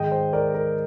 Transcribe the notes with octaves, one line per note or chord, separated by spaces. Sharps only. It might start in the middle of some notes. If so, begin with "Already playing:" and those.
Already playing: G#2 D#3 G#3 D#5 G5
C5
A#4 D5
A#4